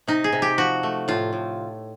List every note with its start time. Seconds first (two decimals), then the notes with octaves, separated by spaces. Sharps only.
0.07 C3 D#4
0.24 G#4
0.32 C3
0.42 G4
0.58 F3 F#4
0.83 A3
1.08 A2 F4
1.33 A2